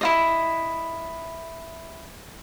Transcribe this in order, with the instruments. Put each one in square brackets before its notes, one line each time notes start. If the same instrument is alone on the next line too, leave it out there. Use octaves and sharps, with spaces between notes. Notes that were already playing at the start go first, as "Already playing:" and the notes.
[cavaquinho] E4 F4 D#5